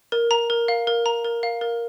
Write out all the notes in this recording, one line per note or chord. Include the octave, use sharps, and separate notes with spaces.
A#4
A#5
A#4
F5
A#4
A#5
A#4
F5
A#4